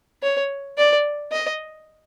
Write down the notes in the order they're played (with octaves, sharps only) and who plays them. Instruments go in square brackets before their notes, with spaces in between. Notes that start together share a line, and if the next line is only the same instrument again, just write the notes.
[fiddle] C#5
D5
D#5